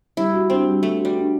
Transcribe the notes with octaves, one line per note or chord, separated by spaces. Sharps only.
G3 E4
F#4
C4 D4
G3
G3 A3
F#4
G3
D4